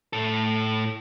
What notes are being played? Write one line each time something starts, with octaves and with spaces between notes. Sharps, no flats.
A2 A4